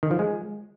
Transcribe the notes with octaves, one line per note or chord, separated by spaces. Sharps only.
D#3
F3
G#3